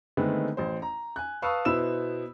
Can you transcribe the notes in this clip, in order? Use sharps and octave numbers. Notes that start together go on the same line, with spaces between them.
D3 D#3 G#3 A3 B3 C4
A1 C5
A#5
G#5 F#6
B4 F5 A5 C#6 D#6 E6
B2 B3 E4 C5 E6 E7